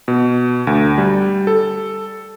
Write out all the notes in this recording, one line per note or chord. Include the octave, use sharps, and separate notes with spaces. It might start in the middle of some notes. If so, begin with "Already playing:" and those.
B2
D2
G3
A4